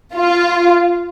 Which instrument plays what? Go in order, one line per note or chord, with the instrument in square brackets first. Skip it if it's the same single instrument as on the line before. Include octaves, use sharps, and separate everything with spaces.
[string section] F4